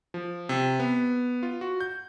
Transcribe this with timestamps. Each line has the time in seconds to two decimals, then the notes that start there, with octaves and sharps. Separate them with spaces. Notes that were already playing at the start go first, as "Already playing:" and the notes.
0.14 F3
0.49 C3
0.80 B3
1.43 F4
1.61 F#4
1.80 G6